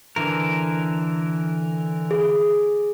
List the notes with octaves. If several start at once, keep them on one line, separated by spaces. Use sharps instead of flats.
D3 E3 A#4
G#4